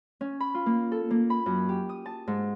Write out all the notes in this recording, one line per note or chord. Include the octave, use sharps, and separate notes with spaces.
C#4
B5
F4
A#3
A4
A#3
B5
F#2
G4
D#6
A5
G#2